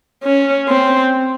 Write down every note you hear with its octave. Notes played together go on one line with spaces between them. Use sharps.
C#4
C4